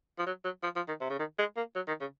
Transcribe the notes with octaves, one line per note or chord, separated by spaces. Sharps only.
F3
F#3
F#3
F3
F3
D#3
C3
C#3
D#3
G#3
A#3
F#3
D#3
C#3